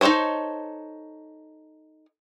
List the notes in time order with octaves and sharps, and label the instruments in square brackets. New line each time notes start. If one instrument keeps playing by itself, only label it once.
[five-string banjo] D#4 A4 A#4 C5 C#5